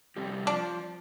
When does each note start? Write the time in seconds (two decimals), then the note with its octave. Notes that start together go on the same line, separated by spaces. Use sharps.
0.17 F2 C3 G3 C4 G4
0.47 F3 D4